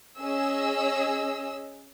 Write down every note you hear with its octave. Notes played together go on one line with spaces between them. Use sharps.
C#4 G#4 D#5 E6